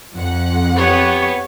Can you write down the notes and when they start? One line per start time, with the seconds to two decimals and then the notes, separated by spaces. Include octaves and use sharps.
0.15 F2 F#5
0.77 B3 G4 C#5